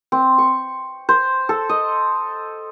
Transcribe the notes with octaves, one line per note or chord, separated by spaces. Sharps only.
C4
C#6
C5
A4
D#5